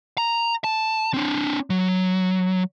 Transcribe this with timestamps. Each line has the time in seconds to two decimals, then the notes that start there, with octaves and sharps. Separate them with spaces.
0.18 A#5
0.64 A5
1.14 C4 D4
1.70 F#3